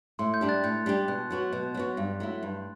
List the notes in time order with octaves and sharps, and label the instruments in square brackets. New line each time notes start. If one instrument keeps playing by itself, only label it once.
[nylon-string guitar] A2 [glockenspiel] C6
[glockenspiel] G6
[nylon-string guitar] G3 D4 G4
[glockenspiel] F#6 A6
[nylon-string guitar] A2 [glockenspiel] G6
[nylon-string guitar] G3 D4 G4
[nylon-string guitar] B2 [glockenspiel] F#6
[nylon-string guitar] F#3 B3 F#4
B2
F#3 B3 F#4
G2
F#3 A3 E4
G2